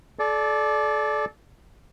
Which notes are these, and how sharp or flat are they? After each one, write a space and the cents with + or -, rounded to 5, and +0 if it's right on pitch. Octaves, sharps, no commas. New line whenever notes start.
A4 -35 D5 +0